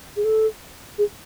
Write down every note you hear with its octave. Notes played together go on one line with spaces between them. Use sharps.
G#4
A4
G#4